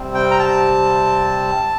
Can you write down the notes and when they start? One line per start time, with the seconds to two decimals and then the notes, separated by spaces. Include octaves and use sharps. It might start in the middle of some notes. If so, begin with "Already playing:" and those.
Already playing: C3 G3 C4
0.15 G5
0.31 A#5
0.39 A5